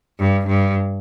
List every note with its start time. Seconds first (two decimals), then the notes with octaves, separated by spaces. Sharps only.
0.19 G2
0.47 G2